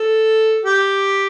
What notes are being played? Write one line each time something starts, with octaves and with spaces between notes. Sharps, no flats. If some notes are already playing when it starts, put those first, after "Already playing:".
Already playing: A4
G4